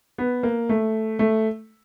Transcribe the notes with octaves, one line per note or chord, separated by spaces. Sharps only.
B3
A#3
A3
A3